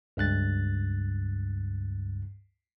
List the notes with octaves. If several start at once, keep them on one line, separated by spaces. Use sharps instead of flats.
C#2 G2 F#6 A6